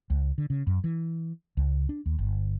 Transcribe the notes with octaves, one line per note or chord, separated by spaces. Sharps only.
C#2
D3
C#3
F#2
E3
C#2
D4
D#2
G1